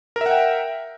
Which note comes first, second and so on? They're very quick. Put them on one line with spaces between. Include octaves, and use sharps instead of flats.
A#4 E5 F#5 G5